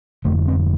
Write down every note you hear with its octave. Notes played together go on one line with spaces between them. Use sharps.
F1 F2 D3 A3
C4